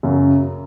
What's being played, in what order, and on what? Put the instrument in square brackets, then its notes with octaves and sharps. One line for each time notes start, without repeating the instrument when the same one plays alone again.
[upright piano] F#2 C#3 F#3